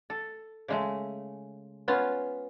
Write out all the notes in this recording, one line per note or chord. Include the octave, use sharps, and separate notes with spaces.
A4
C#3 G#3 A3
B3 C#4 F4